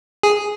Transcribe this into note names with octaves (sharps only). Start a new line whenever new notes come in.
G#4